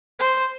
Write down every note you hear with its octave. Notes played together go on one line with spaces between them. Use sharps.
C5